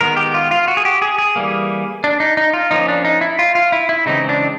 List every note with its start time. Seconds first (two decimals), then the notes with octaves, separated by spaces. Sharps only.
0.01 D#3 G#3 B3 A#4
0.17 G4
0.34 F4
0.51 F4
0.68 F#4
0.77 G#4
0.85 G4
1.02 G#4
1.18 G#4
1.36 E3 G3 A#3
2.04 D4
2.20 D#4
2.37 D#4
2.53 F4
2.71 F3 A#3 C#4 D#4
2.88 D4
3.05 D#4
3.21 E4
3.39 F4
3.55 F4
3.72 E4
3.89 E4
4.06 C#3 E3 G#3 C4 D#4
4.29 D4